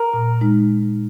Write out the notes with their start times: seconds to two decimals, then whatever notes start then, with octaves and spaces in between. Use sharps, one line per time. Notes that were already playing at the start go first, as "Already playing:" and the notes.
Already playing: A#4
0.14 A#2
0.41 G#3 D#4